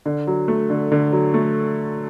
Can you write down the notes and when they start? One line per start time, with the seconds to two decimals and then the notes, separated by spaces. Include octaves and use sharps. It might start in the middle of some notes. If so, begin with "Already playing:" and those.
0.06 D3
0.27 F#3
0.48 A3
0.70 D3
0.92 D3
1.12 F#3
1.34 A3